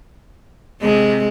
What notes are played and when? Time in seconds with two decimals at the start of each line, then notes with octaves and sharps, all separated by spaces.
0.82 C3 G#3